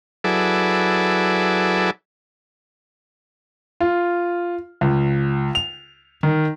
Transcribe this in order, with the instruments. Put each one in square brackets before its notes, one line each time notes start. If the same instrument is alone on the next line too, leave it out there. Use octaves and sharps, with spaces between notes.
[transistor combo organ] F#3 E4 G#4 A4 B4 D5
[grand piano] F4
C#2
F7
D#3